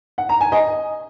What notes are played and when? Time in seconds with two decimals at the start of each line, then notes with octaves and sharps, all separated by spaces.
0.18 F#5
0.29 A#5
0.41 G#5
0.52 D#5